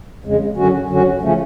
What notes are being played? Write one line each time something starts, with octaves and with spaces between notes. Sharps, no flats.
F2 C#3 G#3
F#2 D3 F#3 C#4 F#4
F#2 D3 F#3 C#4 F#4
C#3 F3 A3 C#4